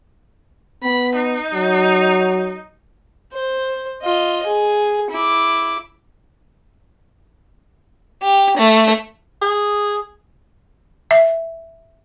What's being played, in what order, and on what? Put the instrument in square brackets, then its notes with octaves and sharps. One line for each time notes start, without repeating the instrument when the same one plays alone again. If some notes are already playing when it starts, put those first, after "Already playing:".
[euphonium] B3 [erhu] B5
[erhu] D#4
[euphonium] F#3
[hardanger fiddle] C5
F4 D#5
G#4
E4 D6
[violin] G4
A3
[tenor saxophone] G#4
[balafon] E5